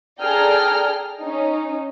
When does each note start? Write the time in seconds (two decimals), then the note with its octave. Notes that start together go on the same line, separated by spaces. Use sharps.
0.21 G#4 A4 D5 G5 A#5 F6
1.21 C#4 D#4